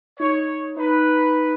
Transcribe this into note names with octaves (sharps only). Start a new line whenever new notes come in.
D#4 C#5
D#4 B4